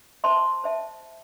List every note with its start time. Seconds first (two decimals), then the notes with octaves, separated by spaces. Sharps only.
0.24 C5 E5 A5 C6
0.64 C5 E5 A5